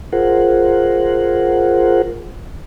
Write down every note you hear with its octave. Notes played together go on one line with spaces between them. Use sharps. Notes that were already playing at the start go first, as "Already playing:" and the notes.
F4 G#4 A#4 C5 F#5